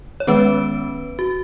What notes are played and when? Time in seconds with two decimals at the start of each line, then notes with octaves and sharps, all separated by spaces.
0.20 C#5
0.27 D#3 G#3 B3 C#4 B4
1.19 F#4